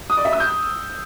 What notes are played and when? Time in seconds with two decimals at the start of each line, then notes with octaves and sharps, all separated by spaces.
0.10 D#6
0.17 D5
0.25 E5
0.32 E6
0.40 G6